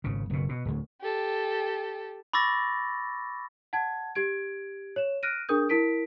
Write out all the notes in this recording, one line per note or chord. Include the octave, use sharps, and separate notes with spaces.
G#1 C#3
F#1 B2
B2
D1 D2
G4 A4
B5 C#6 D6 E6 A6 A#6
F#5 A5 G#6
G4 G#6 D7
C#5 E7
F6 F#6 A#6 D7 D#7
D4 G#4 A#4 D#6 G6
E4 A#4 B6 D7